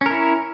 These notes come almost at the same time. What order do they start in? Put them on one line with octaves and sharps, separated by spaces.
C#4 A#4 E4